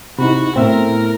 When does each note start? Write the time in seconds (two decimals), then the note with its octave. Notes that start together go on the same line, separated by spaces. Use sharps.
0.19 C3 D#4 E4 F#4 B5
0.56 A2 B3 C4 A#4 E5